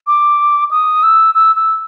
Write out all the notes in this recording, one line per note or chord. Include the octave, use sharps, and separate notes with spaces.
D6
D#6
E6
E6
E6